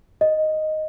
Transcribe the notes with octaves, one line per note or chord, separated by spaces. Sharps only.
D#5